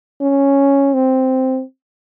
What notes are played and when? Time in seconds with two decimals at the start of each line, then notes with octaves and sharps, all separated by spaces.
0.21 C#4
0.94 C4